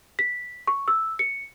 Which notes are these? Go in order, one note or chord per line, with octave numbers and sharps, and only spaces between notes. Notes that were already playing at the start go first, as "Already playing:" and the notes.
B6
C#6
E6
C#7